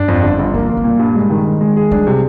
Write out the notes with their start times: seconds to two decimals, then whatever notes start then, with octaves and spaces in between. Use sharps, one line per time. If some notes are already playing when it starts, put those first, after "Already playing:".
Already playing: G2 D4
0.08 F2
0.23 G1
0.39 G1
0.54 F3 A#3
0.69 A#3
0.77 G3
0.84 A#2
0.99 G2
1.15 G#3
1.30 D#3
1.46 D#3
1.61 G#3
1.76 G#4
1.91 G3 D4
2.07 C3